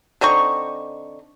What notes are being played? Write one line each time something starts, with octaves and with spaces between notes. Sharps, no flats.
D3 C4 D#4 C#6